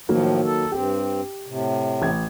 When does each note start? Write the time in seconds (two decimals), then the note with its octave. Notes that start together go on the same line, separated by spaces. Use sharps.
0.09 A2 D#3 F3 F#3 A#3
0.44 A4
0.72 G2 C4 G4
1.46 A2 C3
2.02 A1 G#6